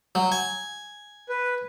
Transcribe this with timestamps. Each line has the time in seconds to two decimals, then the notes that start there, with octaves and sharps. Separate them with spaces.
0.15 F#3
0.32 G#5
1.29 B4